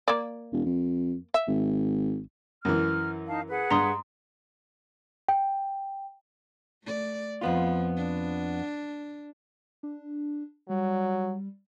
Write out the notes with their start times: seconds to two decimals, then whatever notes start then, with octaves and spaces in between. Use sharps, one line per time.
0.08 A#3 D5
0.52 E1
0.65 F2
1.34 E5
1.48 G#1
2.65 F#2 E3 F6
3.27 D#4 F5 A5
3.50 G#4 B4 F#5
3.71 G2 A#5 C6 D#6
5.29 G5
6.84 A3 D5
7.41 F2 F3 B3 F4
7.97 D4
9.83 D4
10.69 F#3 G3